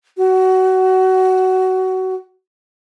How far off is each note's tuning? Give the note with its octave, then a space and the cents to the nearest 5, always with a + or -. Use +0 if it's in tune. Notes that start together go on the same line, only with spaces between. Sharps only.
F#4 +20